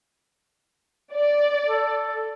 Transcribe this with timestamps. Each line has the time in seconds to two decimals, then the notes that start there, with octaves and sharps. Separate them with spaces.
1.15 D5
1.65 A4